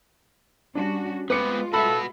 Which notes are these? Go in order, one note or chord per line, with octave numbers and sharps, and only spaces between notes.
G3 C#4 D4 F#4
G#3 B3 C4 F4 B4 D6 C#7
F#4 A4 B4 E5 B5